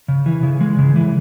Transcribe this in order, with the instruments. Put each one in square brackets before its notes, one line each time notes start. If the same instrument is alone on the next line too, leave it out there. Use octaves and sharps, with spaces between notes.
[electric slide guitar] C#3
E3
C#3
G#3
C#3
E3